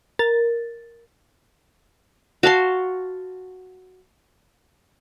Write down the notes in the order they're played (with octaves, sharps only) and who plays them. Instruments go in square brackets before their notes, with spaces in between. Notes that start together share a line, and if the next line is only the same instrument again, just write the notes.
[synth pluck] A#4 A6
[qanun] F#4 F5 A5 C6